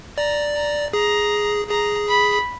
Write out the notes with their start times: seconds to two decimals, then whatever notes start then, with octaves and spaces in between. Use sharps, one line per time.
0.17 D5 A#5
0.55 A#5
0.93 G#4 A#5
1.69 G#4 A#5
2.08 B5